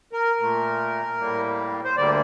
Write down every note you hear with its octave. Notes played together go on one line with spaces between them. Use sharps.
A#4
A#2 A3
A2 G3 A#3
C5
D2 D3 G3 A#3 D5